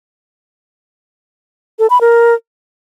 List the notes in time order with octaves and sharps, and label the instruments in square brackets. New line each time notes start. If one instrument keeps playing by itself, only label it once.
[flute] A4
B5
A#4